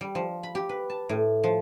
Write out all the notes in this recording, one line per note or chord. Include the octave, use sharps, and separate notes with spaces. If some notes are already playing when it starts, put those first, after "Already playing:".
G3
F3
B5
G4
B4
A5
A2
F3